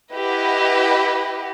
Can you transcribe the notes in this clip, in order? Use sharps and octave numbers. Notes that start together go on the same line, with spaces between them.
E4 G4 B4 D#5 F#5